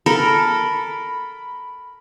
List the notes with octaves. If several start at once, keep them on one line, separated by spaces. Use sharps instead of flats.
A4 A#4 B5